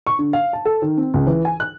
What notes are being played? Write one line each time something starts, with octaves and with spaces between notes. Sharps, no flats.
C#6
D3
F5
A5
A4
D#3
C4
C#2
E3
G#5
F#6